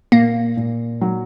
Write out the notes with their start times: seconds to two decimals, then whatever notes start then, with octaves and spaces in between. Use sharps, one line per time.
0.12 A#2 A#3
0.57 A#2
1.01 F#3